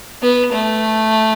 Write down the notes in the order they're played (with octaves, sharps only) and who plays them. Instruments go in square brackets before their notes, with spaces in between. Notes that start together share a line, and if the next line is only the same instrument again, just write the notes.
[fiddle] B3
A3